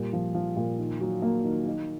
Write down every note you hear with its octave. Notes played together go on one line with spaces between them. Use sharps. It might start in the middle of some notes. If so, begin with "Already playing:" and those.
Already playing: A#2 G3
F3
F3
A#2
D#3
F#3
A#3
D#3
D#4